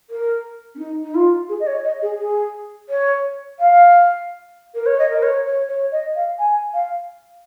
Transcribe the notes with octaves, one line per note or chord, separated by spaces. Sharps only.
A#4
C#4
D#4
D#4
F4
G#4
D#5
C#5
D#5
G#4
G#4
C#5
F5
A#4
C#5
D#5
A#4
C#5
C#5
C#5
D#5
F5
G#5
F5